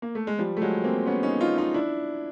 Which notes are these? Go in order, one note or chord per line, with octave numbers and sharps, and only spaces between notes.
A#3
A3
G#3
F3 G3
A3
F#3 G#3
A#3 C4
B3 C#4
C#4 D#4
D#4 F4
D#4 F4
D4 E4